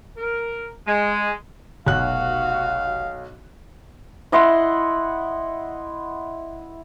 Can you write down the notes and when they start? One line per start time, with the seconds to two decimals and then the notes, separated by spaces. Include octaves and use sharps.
0.17 A#4
0.86 G#3
1.87 F1 B1 F#4 F5 F#6
4.32 E4 D#5 F#5 C6